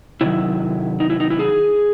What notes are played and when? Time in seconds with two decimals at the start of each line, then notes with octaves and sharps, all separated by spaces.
0.21 C3 D#3 F#3 E4
1.00 D#4
1.10 E4
1.20 D#4
1.30 E4
1.39 G#4